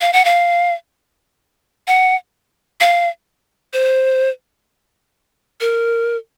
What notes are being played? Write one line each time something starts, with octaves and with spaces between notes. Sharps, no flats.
F5
F#5
F5
F#5
F5
C5
A#4